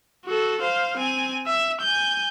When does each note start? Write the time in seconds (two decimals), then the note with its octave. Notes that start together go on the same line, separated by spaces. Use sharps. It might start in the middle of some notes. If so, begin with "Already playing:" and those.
0.25 F#4 A4
0.62 C5 F5
0.97 C4 G#5
1.46 E5
1.81 G#5 G6